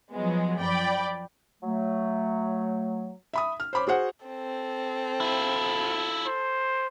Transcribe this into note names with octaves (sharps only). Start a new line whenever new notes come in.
F3 F#3 G#3 B3
F#2 F3 D5 G5 B5
F#3 A3
E5 B5 D#6
F6
C5 C#5 B5 D6
F#4 G#4 C5 F#5
C4 A4
E4 F4
C5